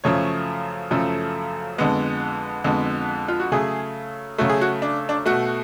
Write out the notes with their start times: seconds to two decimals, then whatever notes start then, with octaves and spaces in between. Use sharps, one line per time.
0.04 F#2 C#3 F3 A3 C#5
0.91 F#2 C#3 F3 A3 A4
1.78 F2 D3 G#3 B3
2.64 F2 D3 G#3 B3
3.29 F4
3.40 F#4
3.52 C#3 F#3 A3 G#4
4.38 C#3 F#3 A3 F#4
4.49 G#4
4.61 F#4
4.82 D4
5.09 D4
5.26 B2 A3 F#4